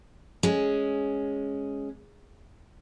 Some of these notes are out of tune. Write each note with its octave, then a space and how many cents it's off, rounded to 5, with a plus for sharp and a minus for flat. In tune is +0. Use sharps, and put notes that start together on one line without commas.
G#3 +0 C#4 +0